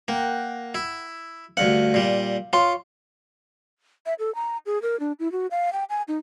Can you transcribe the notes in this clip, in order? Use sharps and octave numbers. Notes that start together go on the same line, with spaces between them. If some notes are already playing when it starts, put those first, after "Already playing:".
A#3 A#4 F#5 G5
E4
D2 G2 F5 F#5
A#2 G3
F4 C#5 F5 C6
E5
A4
A#5
G#4
A#4
D4
E4
F#4
F5
G5
G#5
D#4